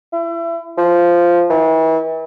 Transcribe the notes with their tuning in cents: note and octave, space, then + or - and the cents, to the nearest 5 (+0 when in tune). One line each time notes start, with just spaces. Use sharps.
E4 +30
F3 -5
E3 -40